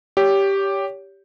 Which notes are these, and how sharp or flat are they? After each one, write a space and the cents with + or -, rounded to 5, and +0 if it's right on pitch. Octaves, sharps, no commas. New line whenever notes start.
G4 +0 C#5 +30